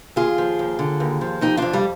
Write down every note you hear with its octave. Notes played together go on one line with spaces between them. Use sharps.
D#2 F4 G#4
F3
D#2
D3
D#2
F3
F2 D#4 G4
F2 D4 F4
G3